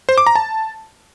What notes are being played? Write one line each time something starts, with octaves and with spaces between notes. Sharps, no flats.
C5
D6
A#5
A5